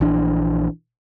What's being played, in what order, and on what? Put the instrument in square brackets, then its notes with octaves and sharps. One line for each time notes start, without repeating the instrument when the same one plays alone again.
[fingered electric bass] A#1 E3 D4